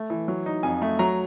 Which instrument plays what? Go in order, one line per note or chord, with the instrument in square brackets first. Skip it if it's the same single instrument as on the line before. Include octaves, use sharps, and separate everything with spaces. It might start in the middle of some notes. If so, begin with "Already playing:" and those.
Already playing: [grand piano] A3
E3
F#3
D#4
F2 G#5
A3
F#3 A#5